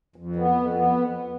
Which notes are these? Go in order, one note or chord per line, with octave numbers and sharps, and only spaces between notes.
F2
B3
F2
B3